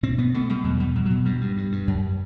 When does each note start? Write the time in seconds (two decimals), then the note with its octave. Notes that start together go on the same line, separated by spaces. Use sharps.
0.03 B2 C4
0.18 B2 B3
0.34 B2 A3
0.49 B2 G3
0.64 E2 F#3
0.80 B2 G3
0.95 B2 F#3
1.05 F#3
1.10 B2
1.25 G2 G3
1.41 G2
1.57 G2
1.72 G2
1.87 F#2